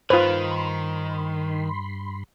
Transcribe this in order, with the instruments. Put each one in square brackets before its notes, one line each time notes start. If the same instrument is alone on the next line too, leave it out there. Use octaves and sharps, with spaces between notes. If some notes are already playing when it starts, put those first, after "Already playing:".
[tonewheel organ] G2 B5 C6 [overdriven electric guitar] D#3 [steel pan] F4 B4 [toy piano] C5